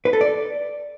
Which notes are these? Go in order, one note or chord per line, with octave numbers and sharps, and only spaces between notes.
B4
A4
D5